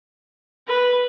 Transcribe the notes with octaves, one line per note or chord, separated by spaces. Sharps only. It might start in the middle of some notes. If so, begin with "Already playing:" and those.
B4